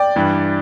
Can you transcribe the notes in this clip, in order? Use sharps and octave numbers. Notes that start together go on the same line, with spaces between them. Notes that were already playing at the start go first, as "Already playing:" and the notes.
Already playing: D5 G5
G2 E3 G3